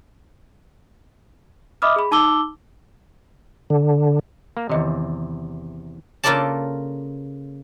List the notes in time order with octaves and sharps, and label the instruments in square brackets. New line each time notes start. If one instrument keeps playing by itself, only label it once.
[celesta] D#5 E5 B5 D6 D#6 F6
G#4 B5
D#4 A5 D6 E6 G7
[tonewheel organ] D3
[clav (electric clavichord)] A#3
[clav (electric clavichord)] E2 C3 [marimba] D#3 D#5
[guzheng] C#3 A#3 F4 A4 D5 A5